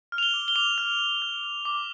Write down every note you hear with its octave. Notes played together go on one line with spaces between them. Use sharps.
F6
F7
G7
D6
G7
D6 F7
F6
F6
F6
F6
D6